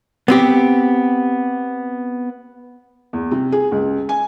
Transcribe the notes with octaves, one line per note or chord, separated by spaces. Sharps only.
B3 C4 G4
E2
C3
G#4
C#2
G#5